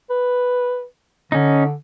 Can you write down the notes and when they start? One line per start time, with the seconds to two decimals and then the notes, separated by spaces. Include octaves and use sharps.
0.10 B4
1.32 D3 C#4 D#4